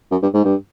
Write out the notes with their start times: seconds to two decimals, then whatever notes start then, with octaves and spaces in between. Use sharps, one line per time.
0.11 F#2
0.22 G2
0.34 G#2
0.45 G2